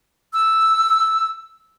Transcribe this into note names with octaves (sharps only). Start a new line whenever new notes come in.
E6